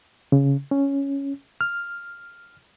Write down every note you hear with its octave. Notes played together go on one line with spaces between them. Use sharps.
C#3
C#4
F6